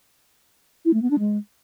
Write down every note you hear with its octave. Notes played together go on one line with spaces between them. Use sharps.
E4
A3
B3
D4
G#3